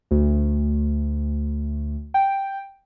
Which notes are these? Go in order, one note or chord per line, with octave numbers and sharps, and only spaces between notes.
D2
G5